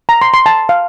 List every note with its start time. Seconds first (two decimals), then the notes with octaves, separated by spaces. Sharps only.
0.09 A#5
0.22 C6
0.34 C6
0.46 A5
0.69 F5